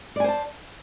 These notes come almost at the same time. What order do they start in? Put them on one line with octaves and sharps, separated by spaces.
D5 G#5 C5 A5